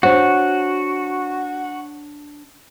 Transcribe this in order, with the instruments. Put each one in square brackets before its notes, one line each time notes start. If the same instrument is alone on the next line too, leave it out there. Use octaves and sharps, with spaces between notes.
[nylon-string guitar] D4 C5 C#5 [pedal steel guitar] F#4